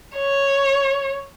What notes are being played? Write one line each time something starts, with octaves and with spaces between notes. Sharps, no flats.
C#5